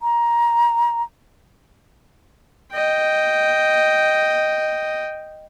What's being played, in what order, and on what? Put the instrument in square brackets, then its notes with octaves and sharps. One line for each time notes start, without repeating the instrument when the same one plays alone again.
[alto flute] A#5
[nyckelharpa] D#5 G5